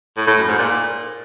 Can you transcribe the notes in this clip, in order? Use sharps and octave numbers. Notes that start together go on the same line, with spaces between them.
A2
A2
F#2
G#2
A#2